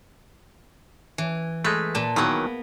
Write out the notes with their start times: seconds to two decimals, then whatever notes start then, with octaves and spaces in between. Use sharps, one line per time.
1.18 E3
1.64 G#3 A3 B4
1.95 A#2 A5
2.16 D#3 E3 F#3 A#3 B3